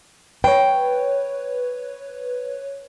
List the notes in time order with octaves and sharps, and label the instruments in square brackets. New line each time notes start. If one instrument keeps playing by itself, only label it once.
[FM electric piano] B4 C#5 [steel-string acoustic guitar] G5